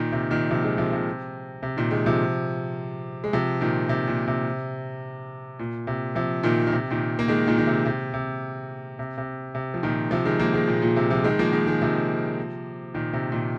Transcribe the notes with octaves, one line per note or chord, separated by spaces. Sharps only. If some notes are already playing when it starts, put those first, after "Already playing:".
Already playing: A#2 D#3
C3
A#2 D#3
C3 F3
D#3 G#3
C3 F3
C3
C3
A#2 D#3
D#3 G#3
C3 F3
G#3
C3 F3
A#2 D#3
C3
A#2
C3
A#2
C3
C3 F3
A#2 D#3
D#3
C3
A#2 D#3
A#3
D#3 G#3
A#2 D#3
D#3
C3
C3
C3
C3
C3
C3
F3
A#2 D#3
C3 F3
D#3 G#3
F3 A#3
D#3 G#3
A#2
A#2
C3
C3 F3
D#3 G#3
F3 A#3
D#3 G#3
D#3 G#3
C3 F3
A#2 D#3
C3
A#2 D#3